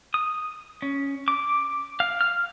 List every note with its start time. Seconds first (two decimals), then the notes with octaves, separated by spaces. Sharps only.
0.14 D#6
0.82 C#4
1.28 D6
2.00 F5
2.21 F6